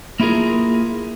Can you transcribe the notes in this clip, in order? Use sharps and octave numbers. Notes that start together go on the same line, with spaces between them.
A#3 E4 F4 G#4 A#4